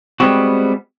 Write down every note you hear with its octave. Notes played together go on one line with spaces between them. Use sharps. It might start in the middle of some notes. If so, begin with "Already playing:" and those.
G3 G#3 B3 C4 F#4